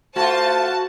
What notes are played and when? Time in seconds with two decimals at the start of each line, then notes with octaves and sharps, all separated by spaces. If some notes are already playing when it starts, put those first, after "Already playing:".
0.16 A3 F4 F#4 C5 A5